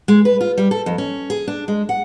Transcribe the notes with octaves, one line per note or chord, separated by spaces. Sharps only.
G#3
B4
F4
G3
A4
F2
C#4
G#4
D4
G#3
F#5